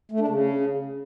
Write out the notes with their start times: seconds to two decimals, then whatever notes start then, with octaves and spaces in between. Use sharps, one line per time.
0.12 A3
0.20 D4
0.28 C#3